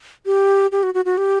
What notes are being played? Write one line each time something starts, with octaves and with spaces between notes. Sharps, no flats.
G4
G4
F#4
F#4
F#4
G4